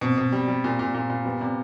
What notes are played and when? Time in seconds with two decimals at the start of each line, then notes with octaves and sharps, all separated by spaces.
0.01 B2 C4
0.18 B2
0.32 G3
0.48 G3
0.64 A#2
0.79 A#2
0.94 A#2
1.10 A#2
1.25 G3 B3
1.41 C3